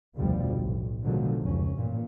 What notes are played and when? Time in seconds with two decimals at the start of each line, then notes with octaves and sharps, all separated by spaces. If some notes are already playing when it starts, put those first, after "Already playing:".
0.16 F1 D2 B2 D3 F3 G3
0.59 B1 A2
1.03 B2 D3 D#3 F3 F#3 G#3
1.42 F1 C#2 C#4
1.76 A1 G2 A#2